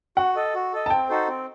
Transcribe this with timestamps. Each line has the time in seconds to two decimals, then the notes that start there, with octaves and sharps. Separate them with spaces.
0.17 F#4 F#5
0.36 A4 D#5
0.54 F#4
0.73 A4 D#5
0.86 A5
0.90 C4 G5
1.09 D#4 F#4 A4 C5
1.28 C4